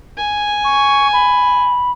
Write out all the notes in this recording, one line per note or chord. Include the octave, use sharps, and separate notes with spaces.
G#5
C#6
B5